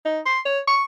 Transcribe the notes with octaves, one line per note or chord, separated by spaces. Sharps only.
D#4
C6
C#5
C#6